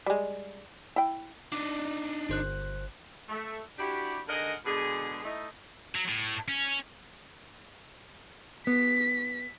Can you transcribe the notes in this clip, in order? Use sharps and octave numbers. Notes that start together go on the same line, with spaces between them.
G3 G#3
E4 G5
D4 D#4 D6
G1 C5 F#6
A3
D4 E4 F#4 G4
D3 G#3 D#4 A#4 D#5 F#5
B2 D3 G#3 G#4
A3 D#4 E4
F#3
A2
C#4
B3 B6